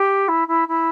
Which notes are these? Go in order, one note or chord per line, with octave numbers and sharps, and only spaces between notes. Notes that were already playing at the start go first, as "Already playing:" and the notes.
Already playing: G4
E4
E4
E4